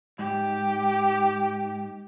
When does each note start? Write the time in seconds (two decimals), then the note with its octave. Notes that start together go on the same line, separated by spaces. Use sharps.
0.19 G#2 G4